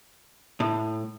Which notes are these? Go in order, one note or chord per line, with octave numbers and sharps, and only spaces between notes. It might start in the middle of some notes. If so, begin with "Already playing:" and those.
A2